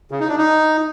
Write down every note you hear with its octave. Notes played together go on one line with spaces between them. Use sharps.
C#3
D#4
D4
D#4